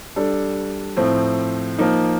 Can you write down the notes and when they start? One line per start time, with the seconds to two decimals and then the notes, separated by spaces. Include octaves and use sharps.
0.16 G3 D4 A4
0.97 A2 F3 C4
1.79 F3 A#3 D#4